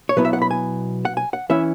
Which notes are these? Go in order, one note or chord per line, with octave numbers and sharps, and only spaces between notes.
C#5
B2 F#3 B3 E4 B4
E5
F#5
B5
G#5
F#5
G#5
F#5
E3 C#4 E4 E5